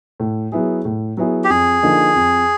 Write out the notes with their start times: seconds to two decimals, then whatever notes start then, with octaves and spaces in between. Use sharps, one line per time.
0.20 A2
0.52 F#3 B3 E4 G#4
0.85 A2
1.17 F#3 B3 E4 G#4
1.44 G4
1.50 F2 G#4
1.83 D3 F3 A#3 D#4
2.15 F2